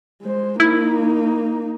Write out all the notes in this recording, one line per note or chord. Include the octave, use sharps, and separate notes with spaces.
G#3 C5
A#3 D#4 E4